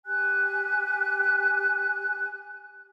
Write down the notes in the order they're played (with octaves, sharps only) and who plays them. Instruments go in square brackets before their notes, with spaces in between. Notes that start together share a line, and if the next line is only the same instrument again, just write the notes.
[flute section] G4 G#5 F#6